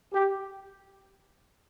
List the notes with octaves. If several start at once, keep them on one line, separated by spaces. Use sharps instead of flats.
G4